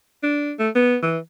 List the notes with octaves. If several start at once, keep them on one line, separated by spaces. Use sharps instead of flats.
D4
A3
B3
E3